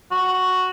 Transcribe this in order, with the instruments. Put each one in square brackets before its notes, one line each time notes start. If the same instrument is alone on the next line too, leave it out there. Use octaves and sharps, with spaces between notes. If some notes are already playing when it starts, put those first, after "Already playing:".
[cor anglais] F#4